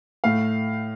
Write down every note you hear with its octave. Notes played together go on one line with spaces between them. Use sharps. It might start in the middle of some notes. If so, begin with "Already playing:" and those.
A2 A3 F5